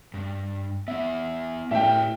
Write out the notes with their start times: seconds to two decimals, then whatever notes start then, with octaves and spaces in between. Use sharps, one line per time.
0.14 G2
0.88 B3 E4 E5
1.71 A2 G4 A#4 B4 E5 G5